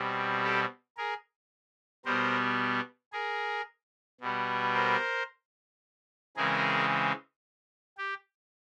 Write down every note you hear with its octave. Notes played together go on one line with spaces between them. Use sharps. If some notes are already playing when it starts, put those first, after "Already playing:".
Already playing: B2 G3 C4
G4 A4
G#4 A#4
B2 G3 B3 A#4 C5
G#4 A#4
B2 G3 B3
A#4 C5
C#3 E3 G#3 C4 G#4 A#4
G4